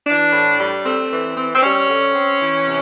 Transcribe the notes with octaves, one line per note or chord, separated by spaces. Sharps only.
E3 D4
A2
G3
A3 C4
E3
C4
C4
G3 C#4
D3
C4
E3
C3